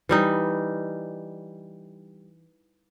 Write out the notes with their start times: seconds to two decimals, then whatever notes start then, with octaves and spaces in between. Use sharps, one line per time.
0.09 E3 G3 D#4